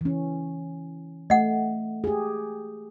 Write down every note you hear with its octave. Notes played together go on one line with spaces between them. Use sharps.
E3 C#4
A3 D#5 F#5
G4 G#4